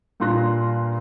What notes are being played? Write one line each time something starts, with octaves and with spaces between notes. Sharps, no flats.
G2 A#2 F4 C6 F#6 A#6